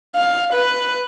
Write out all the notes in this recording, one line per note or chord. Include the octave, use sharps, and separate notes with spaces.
F5
B4